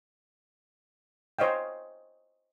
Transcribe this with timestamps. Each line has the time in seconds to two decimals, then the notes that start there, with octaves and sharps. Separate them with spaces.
1.39 C5 C#5 D#5 F5 G5